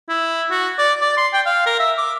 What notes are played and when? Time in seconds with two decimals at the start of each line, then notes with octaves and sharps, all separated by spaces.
0.09 E4
0.51 F#4
0.78 D5
1.01 D5
1.17 C6
1.33 G5
1.46 F5
1.66 A#4
1.79 E5
1.98 D6